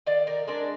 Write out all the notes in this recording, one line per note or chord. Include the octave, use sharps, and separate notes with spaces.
D#3 D5 F5
A#4 D5
G#3 D4 A#4 D5